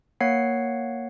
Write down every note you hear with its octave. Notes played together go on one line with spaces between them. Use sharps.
A#3 C#5 F#5 C7